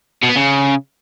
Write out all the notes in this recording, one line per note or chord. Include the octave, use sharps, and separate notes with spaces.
B2
B3
C#3